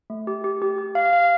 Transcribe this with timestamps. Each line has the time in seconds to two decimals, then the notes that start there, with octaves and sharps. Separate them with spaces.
0.10 A3
0.27 G4
0.44 G4
0.62 G4
0.78 G4
0.95 F5
1.13 F5